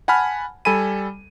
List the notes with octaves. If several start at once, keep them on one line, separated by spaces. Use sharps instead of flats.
F#5 G#5 A5 B5 F6
G3 A4 G#5 B5 D#7